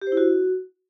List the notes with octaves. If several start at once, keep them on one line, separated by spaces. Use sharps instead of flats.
G4
C5
E4
F#4